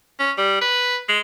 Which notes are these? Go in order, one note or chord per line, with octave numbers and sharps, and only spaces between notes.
C#4
G3
B4
G#3